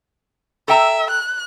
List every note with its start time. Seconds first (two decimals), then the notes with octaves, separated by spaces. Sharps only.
0.68 A4 E5 G5 A#5
1.11 F#6